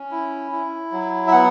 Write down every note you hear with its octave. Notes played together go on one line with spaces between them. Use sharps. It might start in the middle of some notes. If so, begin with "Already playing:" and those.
Already playing: C#4
E4
E4
F#3
E5
B3 F#5